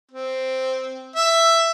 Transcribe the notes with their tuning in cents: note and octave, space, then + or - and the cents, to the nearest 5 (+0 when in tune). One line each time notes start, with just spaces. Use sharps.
C4 -5
E5 +10